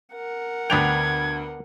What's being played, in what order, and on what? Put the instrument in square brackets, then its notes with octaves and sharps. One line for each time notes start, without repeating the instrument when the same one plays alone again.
[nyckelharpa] A#4 F#5
[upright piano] D2 F7 [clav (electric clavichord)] B3 D4 G5 [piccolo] G#6